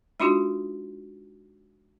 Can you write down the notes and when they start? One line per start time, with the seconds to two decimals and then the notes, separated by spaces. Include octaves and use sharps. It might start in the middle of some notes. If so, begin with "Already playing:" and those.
0.20 G#3 D4 D#4 F4 F#4